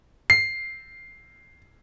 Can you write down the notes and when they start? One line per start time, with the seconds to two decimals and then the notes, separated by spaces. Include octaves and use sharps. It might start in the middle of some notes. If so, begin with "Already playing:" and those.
0.30 C7